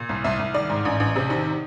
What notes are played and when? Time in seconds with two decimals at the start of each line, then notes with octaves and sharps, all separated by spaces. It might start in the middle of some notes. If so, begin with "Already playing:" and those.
Already playing: A#2
0.09 C2
0.24 C2 E5
0.39 C2
0.54 D#3 D5
0.69 G#2
0.85 A1
1.00 A1
1.16 C3
1.30 D#3